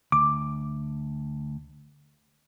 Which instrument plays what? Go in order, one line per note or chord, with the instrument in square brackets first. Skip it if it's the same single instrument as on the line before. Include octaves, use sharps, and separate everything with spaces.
[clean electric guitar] D2 [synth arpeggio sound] D6